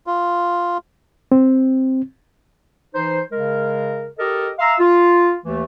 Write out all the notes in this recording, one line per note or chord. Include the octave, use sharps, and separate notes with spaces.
F4
C4
E3 D#4 C5
C#3 G#3 A#4
G4 A4 A#4 D#5
E5 F5 A#5 C6 E6
F4
D#2 E3 A3